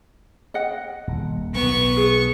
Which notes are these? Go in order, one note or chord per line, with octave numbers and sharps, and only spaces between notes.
D#5 F#5 G5
D#1
B1 B3 C#6
G#4